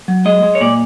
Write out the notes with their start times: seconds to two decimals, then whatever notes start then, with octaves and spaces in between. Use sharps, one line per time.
0.08 F#3
0.25 G#3 D#5
0.43 G#3
0.55 C#5
0.61 A#2 D5